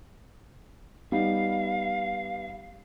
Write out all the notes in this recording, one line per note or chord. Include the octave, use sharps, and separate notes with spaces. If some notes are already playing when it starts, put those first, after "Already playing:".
G3 B3 D#4 F5